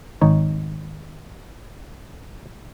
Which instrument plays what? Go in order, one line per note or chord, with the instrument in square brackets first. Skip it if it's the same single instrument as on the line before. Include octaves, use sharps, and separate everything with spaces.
[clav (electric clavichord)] G#1 D#4 C#5